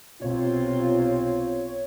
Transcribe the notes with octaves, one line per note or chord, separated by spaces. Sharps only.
B1 C3 C4 F4 C#5